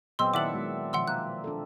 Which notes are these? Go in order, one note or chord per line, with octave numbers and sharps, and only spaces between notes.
A#2 F#3 G#3 B3 C4 C6 E6
D#3 E4 D5 E5 F#5 A5 D6 F#7
G#3 B3 F#4
B2 D#3 F3 F#5 C6 E6
A#3 F#6
D4 F4 A4